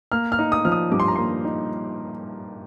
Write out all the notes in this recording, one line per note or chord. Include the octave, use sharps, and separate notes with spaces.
A#3 F6
F6
D#4
D#6
F3 F6
D#6
G2 D6
C6
A#5
A#3 C6
D#4